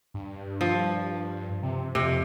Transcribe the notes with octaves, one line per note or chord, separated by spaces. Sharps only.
G2
F3
C3
F2 C3